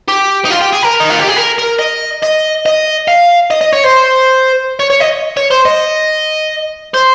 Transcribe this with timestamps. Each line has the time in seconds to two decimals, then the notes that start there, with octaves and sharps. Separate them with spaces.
0.08 G4
0.45 D#4
0.51 F4
0.61 G4
0.73 G#4
0.83 A#4
1.00 D#4
1.10 F4
1.19 G4
1.28 G#4
1.37 A#4
1.58 A#4
1.79 D#5
2.23 D#5
2.66 D#5
3.08 F5
3.50 D#5
3.61 D#5
3.73 C#5
3.84 C5
4.80 C#5
4.90 C#5
5.00 D#5
5.37 C#5
5.51 C5
5.65 D#5
6.94 C5